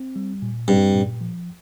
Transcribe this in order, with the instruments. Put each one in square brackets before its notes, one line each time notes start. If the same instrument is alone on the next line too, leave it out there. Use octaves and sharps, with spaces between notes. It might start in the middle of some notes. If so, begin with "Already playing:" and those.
Already playing: [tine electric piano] C4
G3
A#2
[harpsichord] G2 [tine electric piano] C4
[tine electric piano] A#2
F3